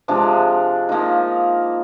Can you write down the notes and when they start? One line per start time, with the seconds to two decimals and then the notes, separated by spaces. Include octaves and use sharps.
0.08 C3 F3 G#3 D4
0.89 F3 A#3 D#4